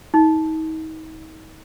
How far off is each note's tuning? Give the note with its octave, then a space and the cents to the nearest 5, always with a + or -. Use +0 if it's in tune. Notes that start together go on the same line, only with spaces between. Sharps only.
D#4 +35